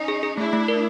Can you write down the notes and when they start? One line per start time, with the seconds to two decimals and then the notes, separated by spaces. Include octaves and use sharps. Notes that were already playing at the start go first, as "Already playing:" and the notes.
Already playing: C#4 D#4
0.08 G#4
0.23 G#4
0.37 A3 D4 E4
0.53 A3
0.68 A#4